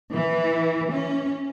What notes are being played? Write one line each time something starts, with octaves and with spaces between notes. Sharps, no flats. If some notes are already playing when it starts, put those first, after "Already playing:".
E3
C#4